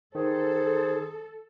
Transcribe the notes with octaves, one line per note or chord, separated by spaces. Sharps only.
D#3 G#4 A4 C5